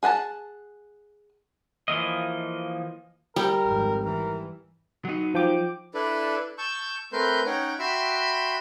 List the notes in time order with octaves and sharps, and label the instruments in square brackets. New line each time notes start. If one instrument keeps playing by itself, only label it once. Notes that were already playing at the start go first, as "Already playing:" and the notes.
[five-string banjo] G#4 F#5 G#5 A5
[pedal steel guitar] E3 F3 A#3 D#5
[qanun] G3 [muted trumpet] A#4
[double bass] G#1 F2
[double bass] E3 [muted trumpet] A#4
[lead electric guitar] F#3 D#4
[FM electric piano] F3 G5 D6
[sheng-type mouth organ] D4 E4 A4 B4 D5
A5 C#6 E6 G6
A3 C4 A#4 B4 C6 G6
C#4 D#4 C#5 F#5 G5
F#4 E5 G5 B5 C6 E6